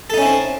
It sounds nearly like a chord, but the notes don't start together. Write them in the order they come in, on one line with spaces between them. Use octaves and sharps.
A4 D#4 C#4 E4 C4